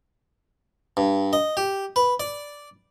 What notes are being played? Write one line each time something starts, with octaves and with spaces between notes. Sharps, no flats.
G2
D#5
G4
B4
D5